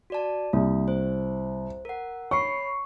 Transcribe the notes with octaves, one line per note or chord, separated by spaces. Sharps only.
F#4 D5 A5
C2 A#3
C5
A#4 F#5
C#5 B5 C#6 C7